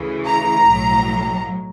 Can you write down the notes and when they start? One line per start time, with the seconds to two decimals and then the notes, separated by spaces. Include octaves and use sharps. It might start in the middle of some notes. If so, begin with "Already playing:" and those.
Already playing: D2 C#3 E3
0.26 A#5
0.67 B1 A2 F#3